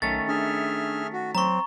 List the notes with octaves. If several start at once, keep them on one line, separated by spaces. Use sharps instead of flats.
B1 D#3 A3 C#4 A6
D4 G#4 E5 F6
F#4
F#3 C4 A#5 C#6